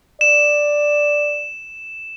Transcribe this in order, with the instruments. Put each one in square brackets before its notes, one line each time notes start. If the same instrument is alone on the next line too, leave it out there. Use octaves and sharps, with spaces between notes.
[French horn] D5 [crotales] E7